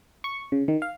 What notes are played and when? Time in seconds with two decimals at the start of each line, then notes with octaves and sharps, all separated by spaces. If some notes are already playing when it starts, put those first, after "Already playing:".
0.24 C#6
0.52 C#3
0.68 D#3
0.82 F5